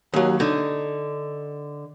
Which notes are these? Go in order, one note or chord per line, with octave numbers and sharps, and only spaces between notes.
D#2 F#3
D3 D#4